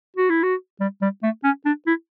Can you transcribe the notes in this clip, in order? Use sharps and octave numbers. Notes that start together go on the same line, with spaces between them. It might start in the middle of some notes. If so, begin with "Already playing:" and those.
F#4
E4
F#4
G3
G3
A3
C#4
D4
E4